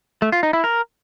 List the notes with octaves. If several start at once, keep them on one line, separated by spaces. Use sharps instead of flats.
A3
F4
D#4
E4
A#4